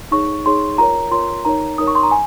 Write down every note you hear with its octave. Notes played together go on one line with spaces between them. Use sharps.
D#4 G#4 C#5 C#6
D#4 G#4 C#5 C6
F4 A#4 C#5 A#5
F4 A#4 C#5 C6
D#4 A#4 C#5 A#5
D#4 A#4 C#5 D#6
C#6
C6
A#5
G#5